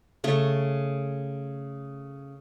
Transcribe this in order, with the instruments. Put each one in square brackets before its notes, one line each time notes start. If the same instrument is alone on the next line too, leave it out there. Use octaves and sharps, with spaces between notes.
[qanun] C#3 A3 C#5